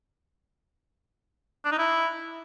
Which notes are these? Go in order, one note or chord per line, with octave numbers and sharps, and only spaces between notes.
D4
D#4
E4